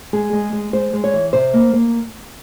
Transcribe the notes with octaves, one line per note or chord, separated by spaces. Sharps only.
G#3 G#4
G#3
G#3
G#3 C5
G#3
C#5
E3
C3 C5
A#3
A#3